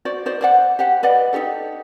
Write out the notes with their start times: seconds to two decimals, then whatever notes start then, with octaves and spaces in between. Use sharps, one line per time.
0.05 F#4 C5 D5
0.26 D#4 C5 D5
0.41 C5 D5 F#5
0.79 G4 C5 F#5
1.03 B4 D5 D#5 F#5
1.33 D#4 F4 G4 A4